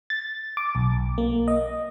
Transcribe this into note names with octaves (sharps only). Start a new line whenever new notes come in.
A6
D6
B1
A#3
D#5